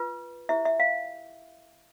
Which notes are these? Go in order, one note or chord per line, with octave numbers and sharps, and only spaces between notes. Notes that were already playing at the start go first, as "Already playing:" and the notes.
Already playing: F4 B4
E4 G4 C5 E5
E5
F5